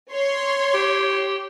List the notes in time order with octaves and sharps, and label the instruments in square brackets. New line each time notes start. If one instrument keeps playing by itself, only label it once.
[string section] C#5 C6
[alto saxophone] G4